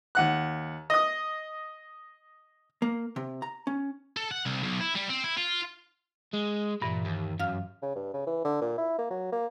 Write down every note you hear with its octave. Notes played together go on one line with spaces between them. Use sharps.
D#2 F#5 F#6
D#5 D#6
A#3
C3
A#5
C#4
A4
F#5
C2
B1
E4
G3
C4
E4
F4
G#3
G2 A#2 E3
D#2
F#2 F5 F6
C#3
G2
C#3
E3
D3
A#2
E4
A#3
F#3
A#3